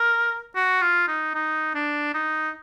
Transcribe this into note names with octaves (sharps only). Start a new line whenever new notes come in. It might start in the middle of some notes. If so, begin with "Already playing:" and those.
Already playing: A#4
F#4
F4
D#4
D#4
D4
D#4